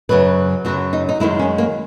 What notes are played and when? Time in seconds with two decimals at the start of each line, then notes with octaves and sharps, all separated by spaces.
0.09 F#2 C#3 F#3 B4
0.65 F#2 C#3 F#3 F#4
0.93 D#4
1.09 D#4
1.20 F#2 D#3 G#3 E4
1.39 C#4
1.58 A#3